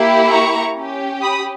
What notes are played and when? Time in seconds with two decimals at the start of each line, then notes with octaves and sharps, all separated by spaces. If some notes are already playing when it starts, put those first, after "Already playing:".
Already playing: A#3 E4 G4
0.32 A#5 C#6
0.76 C#4 G4
1.22 B5 D#6